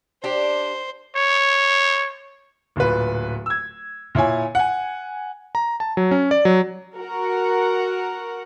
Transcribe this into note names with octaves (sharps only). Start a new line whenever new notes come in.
D4 G4 C5
C#5
D1 A#2 B4
E6 G#6
A#2 E4 C#5 G#5
F#5 G#5
A#5
A5
F#3
C#4
D5
F#3
F#4 A#4 F#5